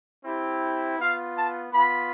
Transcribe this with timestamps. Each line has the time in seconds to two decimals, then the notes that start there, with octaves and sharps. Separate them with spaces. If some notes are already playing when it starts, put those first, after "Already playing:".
0.24 C4 E4 G4
0.99 B3 F4 F5
1.36 A5
1.73 B3 F4 B5